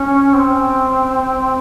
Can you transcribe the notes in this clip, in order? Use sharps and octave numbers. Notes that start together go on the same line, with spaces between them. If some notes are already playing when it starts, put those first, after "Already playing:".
Already playing: C#4
C4